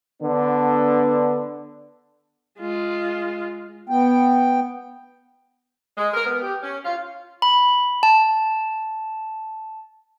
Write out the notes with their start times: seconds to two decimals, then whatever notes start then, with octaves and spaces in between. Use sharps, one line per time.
0.22 D3 B3 D4
2.60 G#3 F4
3.89 B3 G5
5.97 G#3
6.14 A#4
6.26 B3
6.42 G4
6.62 C#4
6.85 F4
7.42 B5
8.03 A5